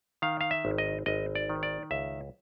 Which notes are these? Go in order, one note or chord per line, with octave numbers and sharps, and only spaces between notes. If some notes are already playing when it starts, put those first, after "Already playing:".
D#3 F5
F5
E5
G#1
D#5
G#1 D#5
D5
D#3
D5
C#2 E5